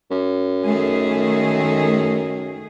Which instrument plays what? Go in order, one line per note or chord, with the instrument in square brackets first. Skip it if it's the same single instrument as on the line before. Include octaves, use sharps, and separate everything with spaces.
[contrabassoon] F#2
[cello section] D#3 A3 G#4